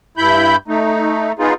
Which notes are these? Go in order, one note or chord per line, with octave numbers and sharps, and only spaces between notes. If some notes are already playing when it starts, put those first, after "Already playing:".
G2 E4 B5 G6
A3 D#4
B3 D#4 F4 G#4